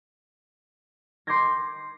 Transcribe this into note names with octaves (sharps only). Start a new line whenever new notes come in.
C6 D6 G6 G#6 A#6